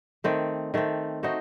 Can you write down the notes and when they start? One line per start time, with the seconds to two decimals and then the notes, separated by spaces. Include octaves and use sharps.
0.24 D#3 A3 C4
0.74 D#3 A3 C4
1.23 A3 D#4 F#4 C5